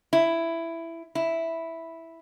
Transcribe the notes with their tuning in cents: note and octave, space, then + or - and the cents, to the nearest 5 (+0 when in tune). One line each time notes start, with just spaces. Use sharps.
E4 +10
E4 -5